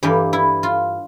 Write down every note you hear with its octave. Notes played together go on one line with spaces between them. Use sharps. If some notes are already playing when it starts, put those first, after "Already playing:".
G2 E3 A#3 G4
E4
F4